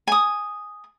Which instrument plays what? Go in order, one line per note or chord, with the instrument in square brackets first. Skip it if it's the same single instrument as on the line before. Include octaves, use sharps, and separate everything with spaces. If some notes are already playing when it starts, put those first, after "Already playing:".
[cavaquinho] G#5 D#6